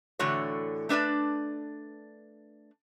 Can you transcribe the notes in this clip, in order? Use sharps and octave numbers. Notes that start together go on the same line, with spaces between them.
A2 D3 E3 A3 F#4 C#5
A3 D4 B4 D5 A5